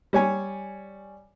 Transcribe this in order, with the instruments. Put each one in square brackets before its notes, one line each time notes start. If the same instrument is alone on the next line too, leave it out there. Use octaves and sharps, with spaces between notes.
[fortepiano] G3 C#5 G#5